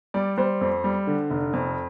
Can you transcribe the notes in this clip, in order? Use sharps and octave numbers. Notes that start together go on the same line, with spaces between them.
G3 D5
G3 C5
F2
G3
D3
F1
F2